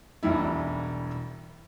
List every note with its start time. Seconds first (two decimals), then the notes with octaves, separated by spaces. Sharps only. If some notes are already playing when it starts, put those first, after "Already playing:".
0.23 E1 B1 E3 G3 E4